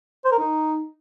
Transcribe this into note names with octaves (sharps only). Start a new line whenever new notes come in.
C5
A#4
D#4